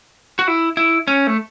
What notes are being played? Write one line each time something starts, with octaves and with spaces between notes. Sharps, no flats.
F#4
E4
E4
C#4
A3